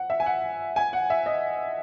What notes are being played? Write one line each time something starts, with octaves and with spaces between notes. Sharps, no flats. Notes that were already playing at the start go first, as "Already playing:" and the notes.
Already playing: F#5
E5
G#5
F#5
G#5
F#5
E5
D#5